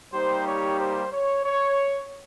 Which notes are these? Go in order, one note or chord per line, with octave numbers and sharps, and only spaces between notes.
G3 A#3 D#4 G4 C5
C#5
C5
C#5
C#5